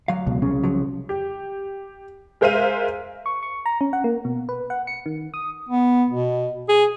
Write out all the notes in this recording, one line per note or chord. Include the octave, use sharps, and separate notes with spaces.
D2 F#3 F5
C#2 B2
C2 C#3 C#4
F3 F#3
G4
G#3 A#4 C5 E5 F5 D#7
C#6
C#6
A#5
C#4
F#5
A#3
B2
B4
F#5
C#7
D#3
D#6
B3
B2
G#4